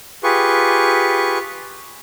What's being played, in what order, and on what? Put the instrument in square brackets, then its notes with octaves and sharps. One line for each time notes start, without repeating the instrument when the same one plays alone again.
[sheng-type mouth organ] F4 G4 G#4 B4 C#6